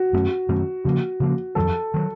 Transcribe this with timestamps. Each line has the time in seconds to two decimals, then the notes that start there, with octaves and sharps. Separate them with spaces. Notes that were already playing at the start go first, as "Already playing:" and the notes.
Already playing: F#4
0.13 F#2 D#3 A3 C#4
0.49 F#2 D#3 A3 C#4
0.84 C#3 F3 A#3 F#4
1.20 C#3 F3 A#3
1.55 F2 D#3 F#3 A4
1.94 D#3 F#3